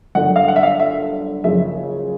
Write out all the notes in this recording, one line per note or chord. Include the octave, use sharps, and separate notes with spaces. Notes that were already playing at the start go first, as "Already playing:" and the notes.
G1 F#2 D3 F#5
F5
F#5
E5
F5
E5
F#1 F#2 C#3 F3 E5